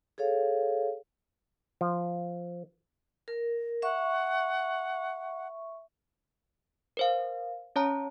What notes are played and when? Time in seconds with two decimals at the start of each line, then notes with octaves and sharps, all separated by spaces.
0.18 G#4 A4 C#5 F5
1.81 F3
3.28 A#4
3.82 E5 F#5 C#6
6.97 A#4 C5 F5
7.76 C#4 C#5 A5 A#5